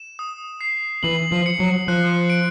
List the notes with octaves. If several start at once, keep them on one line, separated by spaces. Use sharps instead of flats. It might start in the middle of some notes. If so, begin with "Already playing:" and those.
Already playing: E7
D#6
C7
E3 F#7
F3
C#7
F#3
F3 F#6
D7